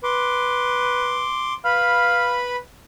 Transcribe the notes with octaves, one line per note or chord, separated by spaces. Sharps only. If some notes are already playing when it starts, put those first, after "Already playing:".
B4 C6 D6
B4 F5 B5